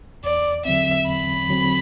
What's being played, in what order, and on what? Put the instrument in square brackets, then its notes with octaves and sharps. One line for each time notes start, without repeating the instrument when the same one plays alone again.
[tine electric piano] E2 [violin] D5
[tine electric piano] D3 F#3 C4 [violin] E5
[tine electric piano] E2 [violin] B5
[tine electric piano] D3 F#3 C4